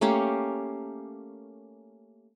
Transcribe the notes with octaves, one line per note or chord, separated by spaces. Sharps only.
A3 A#3 C#4 G4